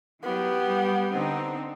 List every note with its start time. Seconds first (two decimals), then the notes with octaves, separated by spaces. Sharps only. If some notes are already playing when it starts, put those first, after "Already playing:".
0.23 E3 F#3 B3 G4
0.66 G3
1.11 D3 C4 D#4